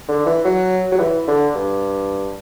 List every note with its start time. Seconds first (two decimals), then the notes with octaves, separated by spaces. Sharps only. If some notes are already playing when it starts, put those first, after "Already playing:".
0.08 D3
0.26 E3
0.44 F#3
0.92 F#3
0.99 E3
1.27 D3
1.55 G2